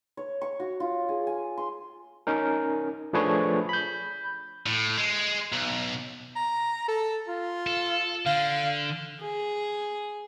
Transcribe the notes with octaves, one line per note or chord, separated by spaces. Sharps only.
C#5
C#6
F#4
F4
G#4
G#5
C6
C#4 D#4 A#4
F3 A3 D4 G#4 B4 C#5
B5 G6
A2
G#3
B1
A#5
A4
F4
A4
D3 F5
G#4